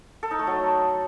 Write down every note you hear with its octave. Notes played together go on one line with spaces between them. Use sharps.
A4
D#4
A3
F#3